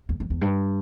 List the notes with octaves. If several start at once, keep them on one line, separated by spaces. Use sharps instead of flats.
E2
F2
E2
G2